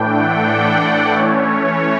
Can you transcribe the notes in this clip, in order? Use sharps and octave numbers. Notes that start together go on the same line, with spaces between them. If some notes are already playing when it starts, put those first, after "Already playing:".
Already playing: A2 E3 A3 D4 G5
F#5
D5
E3 A3 C#4 C#5